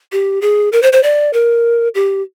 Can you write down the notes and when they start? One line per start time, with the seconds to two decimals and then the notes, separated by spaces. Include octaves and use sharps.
0.12 G4
0.42 G#4
0.72 A#4
0.82 C5
0.93 C5
1.03 D5
1.33 A#4
1.95 G4